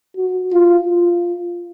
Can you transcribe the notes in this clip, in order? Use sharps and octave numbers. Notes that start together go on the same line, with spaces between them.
F#4
F4
F4